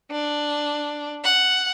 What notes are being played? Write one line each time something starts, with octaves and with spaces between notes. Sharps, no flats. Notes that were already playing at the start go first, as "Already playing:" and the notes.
D4
F#5